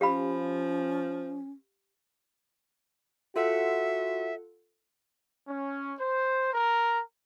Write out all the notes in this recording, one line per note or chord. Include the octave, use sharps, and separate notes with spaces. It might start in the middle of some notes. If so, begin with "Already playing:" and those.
F3 C#4 G4 F5 B5
F4 F#4 A4 E5 F#5
C#4
C5
A#4